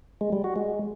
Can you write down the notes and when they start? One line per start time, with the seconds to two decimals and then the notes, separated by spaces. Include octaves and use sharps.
0.21 G#3
0.33 G3
0.44 F#4
0.56 G#3